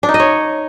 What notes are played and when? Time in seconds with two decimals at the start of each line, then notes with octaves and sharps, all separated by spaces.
0.03 D4
0.09 D#4
0.14 D#5
0.20 C#5